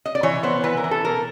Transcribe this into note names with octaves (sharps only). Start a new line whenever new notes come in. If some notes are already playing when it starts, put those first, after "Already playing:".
D#5
D5
E3 C#5
B3 C5
E3 B4
A#4
E3
A4
B2 A#4